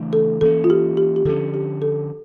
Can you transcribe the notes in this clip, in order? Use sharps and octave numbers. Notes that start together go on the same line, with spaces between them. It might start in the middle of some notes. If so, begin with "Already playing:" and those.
Already playing: C#3 E3 A3 D4
A4
E3 A#3 C#4 A4
F4
G4
G4
G4
D3 F3 C#4 A4
G4
A4